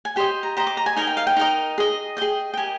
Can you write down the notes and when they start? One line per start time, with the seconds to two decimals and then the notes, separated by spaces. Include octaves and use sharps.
0.05 G#5
0.16 G4 C5 D#5 G5
0.43 A#5
0.57 G4 C5 D#5 A#5
0.67 D6
0.77 A#5
0.86 G#5
0.96 D#4 A#4 D#5 G#5
1.07 G5
1.17 F5
1.27 G5
1.36 D#4 A#4 D#5
1.78 G#4 D#5
2.17 G#4 D#5 G5
2.54 G5
2.57 G4 A#4 D#5 G#5